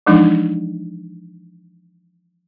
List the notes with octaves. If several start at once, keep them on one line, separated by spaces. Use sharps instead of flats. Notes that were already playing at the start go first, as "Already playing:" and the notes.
E3 F3 G#3 D4 D#4